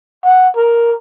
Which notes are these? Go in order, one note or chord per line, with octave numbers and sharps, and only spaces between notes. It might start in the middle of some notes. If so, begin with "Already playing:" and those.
F#5
A#4